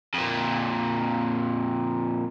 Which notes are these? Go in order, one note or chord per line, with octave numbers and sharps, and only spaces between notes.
F2 A#2